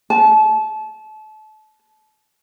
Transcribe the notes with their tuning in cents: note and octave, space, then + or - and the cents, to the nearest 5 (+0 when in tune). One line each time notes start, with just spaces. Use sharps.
A5 -30